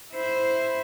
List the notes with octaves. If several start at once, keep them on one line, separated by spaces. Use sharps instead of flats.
E4 C5